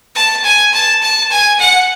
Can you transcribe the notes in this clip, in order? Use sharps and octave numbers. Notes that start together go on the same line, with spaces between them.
A5
G#5
A5
A5
G#5
F#5